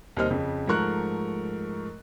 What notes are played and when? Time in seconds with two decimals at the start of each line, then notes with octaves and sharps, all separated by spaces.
0.17 D#2 C3 G3 C5 D#5 F6
0.30 F2 C#3
0.68 G#2 F3 A3 A#4 C#6 F#6